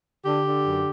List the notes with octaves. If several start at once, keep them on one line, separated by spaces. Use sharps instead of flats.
D3 G4
D3
F#2